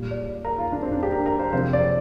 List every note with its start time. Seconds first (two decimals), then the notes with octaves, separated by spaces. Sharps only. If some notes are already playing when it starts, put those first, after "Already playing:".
Already playing: A#2 G3
0.11 D5
0.45 A#4
0.58 F4
0.72 D4
0.83 C4
0.92 D4
1.03 G4
1.12 A#4
1.26 A#4
1.39 C5
1.52 C3 F3 C5
1.73 D5